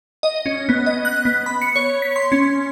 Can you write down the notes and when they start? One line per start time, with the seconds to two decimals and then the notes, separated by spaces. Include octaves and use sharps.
0.23 D#5
0.46 C#4
0.69 B3
0.86 D#5
1.05 F#6
1.25 B3
1.46 B5
1.62 C#7
1.76 C#5
2.02 B6
2.16 C6
2.32 C#4